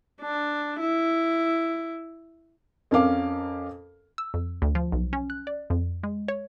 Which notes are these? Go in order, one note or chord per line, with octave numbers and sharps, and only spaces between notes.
D4
E4
F2 C#4 A#4 F5 D6
E6
F2
D2
F3
B1
C#4
F#6
D5
F2
G#3
C#5